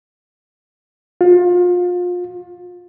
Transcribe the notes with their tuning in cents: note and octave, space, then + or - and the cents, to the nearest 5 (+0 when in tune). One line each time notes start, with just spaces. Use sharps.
F4 +30